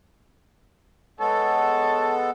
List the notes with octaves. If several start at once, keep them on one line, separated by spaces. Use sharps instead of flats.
G#3 B3 A4 C#5 A5